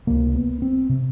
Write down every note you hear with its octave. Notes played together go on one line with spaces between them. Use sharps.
C#2 C3 A#3
B3
C4
C3